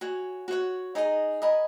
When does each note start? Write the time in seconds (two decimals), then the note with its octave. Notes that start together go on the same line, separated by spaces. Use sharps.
0.01 F#4 C#5 G#5
0.48 F#4 C#5 F#5
0.95 D#4 G#4 D#5 A#5
1.42 A#4 D#5 G#5 B5